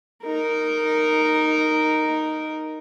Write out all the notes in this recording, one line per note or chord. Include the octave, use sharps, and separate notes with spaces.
D#4 A#4